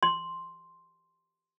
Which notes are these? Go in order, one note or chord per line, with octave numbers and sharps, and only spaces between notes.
C6